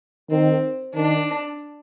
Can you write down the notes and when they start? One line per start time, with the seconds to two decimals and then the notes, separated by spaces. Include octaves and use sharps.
0.30 D#3 C4
0.96 D#3 D4